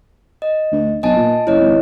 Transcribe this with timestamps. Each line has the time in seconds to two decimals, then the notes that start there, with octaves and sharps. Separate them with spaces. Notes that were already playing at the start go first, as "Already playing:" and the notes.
0.42 D#5
0.72 D2
1.03 B1 D#5 G#5 A5
1.16 A#2
1.47 F#1 E4 C#5 D#5
1.60 G#1